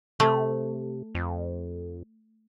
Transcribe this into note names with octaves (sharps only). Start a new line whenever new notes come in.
C3 A3
F2